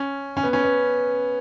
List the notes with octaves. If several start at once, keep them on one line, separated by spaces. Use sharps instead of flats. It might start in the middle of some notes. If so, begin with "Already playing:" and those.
Already playing: C#4
C#4
B3
C#4
B3